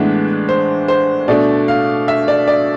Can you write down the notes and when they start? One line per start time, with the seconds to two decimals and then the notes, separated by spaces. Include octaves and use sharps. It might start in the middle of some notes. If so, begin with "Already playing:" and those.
Already playing: A2 E3 G#3 B3 D4
0.49 C5
0.88 C5
1.28 B2 A3 D4 D5
1.68 F5
2.08 E5
2.28 D5
2.48 D5